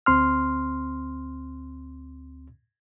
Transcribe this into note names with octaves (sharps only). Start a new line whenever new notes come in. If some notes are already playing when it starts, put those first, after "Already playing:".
D2 C4 C6 F6